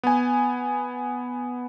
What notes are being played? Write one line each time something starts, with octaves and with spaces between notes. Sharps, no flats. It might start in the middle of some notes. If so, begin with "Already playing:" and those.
B3 G#5